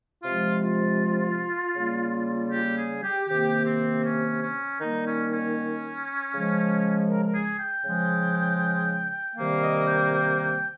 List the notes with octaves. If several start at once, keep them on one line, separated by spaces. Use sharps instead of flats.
C3 F3 G#3 F4
F4
C#3 G3 A#3
G4
G#4
G4
C3 D#3 A#3 G4
C4
C#4
C#4
D#3 G3 A#3 D#4
C#4
C#4
C#3 F3 G#3
A#4
A#4
G#4
G5
C#3 F3 G#3
C3 D#3 G3 A#3 F5
D#5
G5
G5
G5